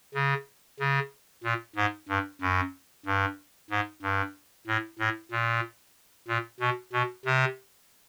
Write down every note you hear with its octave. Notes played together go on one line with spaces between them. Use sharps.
C#3
C#3
A#2
G#2
G2
F#2
G2
G#2
G2
A2
A2
A#2
A#2
B2
B2
C3